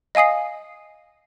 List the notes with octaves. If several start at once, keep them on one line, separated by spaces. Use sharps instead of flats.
D#5 F5 G#5 D#6 C7